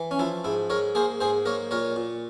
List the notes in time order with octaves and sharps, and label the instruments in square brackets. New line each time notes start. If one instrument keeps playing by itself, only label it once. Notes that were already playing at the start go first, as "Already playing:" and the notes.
Already playing: [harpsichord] E3
C#4
F3 E4
G#2 E4
G#2 A#4 C#5
A#3 G#4 C5
G#2 G#4 C5
A#3 A#4 C#5
A#2 A#4 C#5
A#2